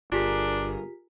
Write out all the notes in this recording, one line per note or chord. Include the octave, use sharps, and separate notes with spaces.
G1 D4 F4 G4 G#4 A#4 B6